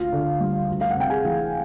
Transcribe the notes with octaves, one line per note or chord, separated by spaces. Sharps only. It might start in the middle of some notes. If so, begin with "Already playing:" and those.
Already playing: D2 F4 F5
D3
G3
D2
F5
F#5
C3 G5
G#4 G#5
E3